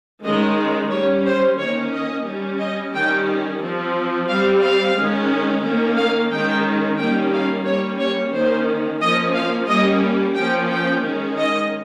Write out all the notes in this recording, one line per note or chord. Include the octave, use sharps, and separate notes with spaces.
D#3 G#3 C#4 D#5
G3 C#4 C#5
C5
D#3 A#3 C#4 C#5
D#5
G3 C#4
D#5
D#3 G3 C#4 G5
F3 C4
G3 C4 F5
F5
D#3 G#3 C#4
D#3 A#3 C#4
F5
D#3 G#3 C#4 G5
D#3 G3 A#3 C#4 G5
F5
G3 A#3 C#4 C#5
C#5
D#3 A#3 C#4 C5
F3 A#3 C#4 D#5
F5
G3 A#3 C#4 D#5
F3 A#3 C#4 G5
G5
D#3 G#3 C#4
D#5